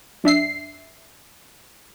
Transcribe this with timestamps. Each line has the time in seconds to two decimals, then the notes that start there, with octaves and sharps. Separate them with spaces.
0.24 F#2 D4 E5 C7